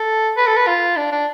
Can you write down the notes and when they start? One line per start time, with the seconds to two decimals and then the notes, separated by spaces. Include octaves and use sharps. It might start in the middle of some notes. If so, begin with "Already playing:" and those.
Already playing: A4
0.37 B4
0.47 A4
0.57 B4
0.67 F4
0.97 D4
1.12 D4